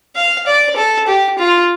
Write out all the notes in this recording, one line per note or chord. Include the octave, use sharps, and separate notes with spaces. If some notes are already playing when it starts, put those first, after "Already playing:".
F5
D5
A4
G4
F4